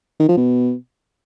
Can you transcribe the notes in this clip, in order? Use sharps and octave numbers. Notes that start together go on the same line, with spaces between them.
D#3
F3
B2